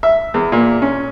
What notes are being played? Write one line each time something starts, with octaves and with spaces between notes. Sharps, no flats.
E5
E2
A#2
C#4